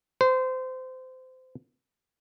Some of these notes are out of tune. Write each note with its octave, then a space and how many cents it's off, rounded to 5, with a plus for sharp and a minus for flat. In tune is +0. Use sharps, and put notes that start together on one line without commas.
C5 -25